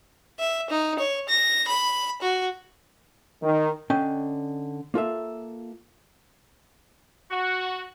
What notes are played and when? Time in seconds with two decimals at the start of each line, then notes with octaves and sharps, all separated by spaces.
0.39 E5
0.70 D#4
0.99 C#5
1.29 A#6
1.68 B5
2.22 F#4
3.42 D#3
3.90 D3 C#4 D#5 G5
4.94 A#3 F4 A4 E5
7.31 F#4